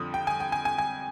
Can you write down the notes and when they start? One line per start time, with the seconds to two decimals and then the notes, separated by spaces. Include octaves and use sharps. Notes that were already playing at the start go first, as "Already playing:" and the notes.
Already playing: F2 D3 F3 D#6
0.14 G5
0.27 G#5
0.40 G5
0.52 G#5
0.65 G#5
0.78 G#5